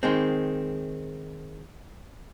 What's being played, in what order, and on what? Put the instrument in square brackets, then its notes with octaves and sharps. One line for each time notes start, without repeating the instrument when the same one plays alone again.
[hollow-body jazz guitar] D#3 G#3 C4